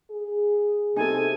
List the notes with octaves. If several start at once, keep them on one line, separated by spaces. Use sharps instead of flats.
G#4
C3 D#4 G#4 A4 G#5